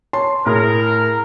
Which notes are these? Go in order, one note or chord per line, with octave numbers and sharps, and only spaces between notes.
C#5 A5 C6
A2 G#4 A#4